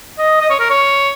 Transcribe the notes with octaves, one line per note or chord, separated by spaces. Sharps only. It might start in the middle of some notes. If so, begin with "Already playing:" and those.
D#5
D#5
C#5
A#4
C#5